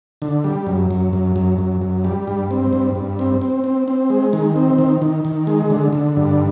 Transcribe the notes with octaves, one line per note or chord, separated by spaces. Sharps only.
D3
G3
F#2
F#2
F#2
F#2
F#2
F#2
G3
G2
C4
G2
G2
C4
C4
C4
C4
G#3
D#3
C4
D#3
D#3
D#3
G#3
D3
D3
G2